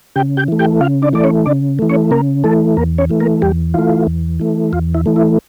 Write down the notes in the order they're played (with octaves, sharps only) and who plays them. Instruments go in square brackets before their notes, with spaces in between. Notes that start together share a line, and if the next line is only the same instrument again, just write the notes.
[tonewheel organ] C#3 G4 G5
G4 G5
E3 A3
G4 G5
C#3 F4 F5
D4 D5
E3 A3 D5
C#4 C#5
C#3 D4 D5
E3 A3
C#4 C#5
C#3 A#3 A#4
E3 A3 A4
E2 A#3 A#4
C#4 C#5
E3 A3
A#3 A#4
E2 G3 G4
E3 A3 F4
E2
E3 A3
E2 F4
E4
E3 A3
E4